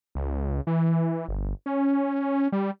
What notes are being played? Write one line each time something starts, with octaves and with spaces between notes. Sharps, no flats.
C#2
E3
G1
C#4
G3